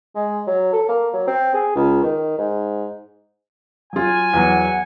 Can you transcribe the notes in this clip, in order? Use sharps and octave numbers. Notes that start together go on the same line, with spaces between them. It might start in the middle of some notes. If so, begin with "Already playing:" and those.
G#3
F#3
A4
A#3
F#3
C4
G#4
C#2
D#3
G#2
F#3 F4 G#5
E2 F#3 F#5